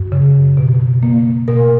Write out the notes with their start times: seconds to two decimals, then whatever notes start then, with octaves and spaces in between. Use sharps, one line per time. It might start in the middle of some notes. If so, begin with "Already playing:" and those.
Already playing: F#2
0.12 C#3
0.57 B2
1.03 A#3
1.48 B2 A#4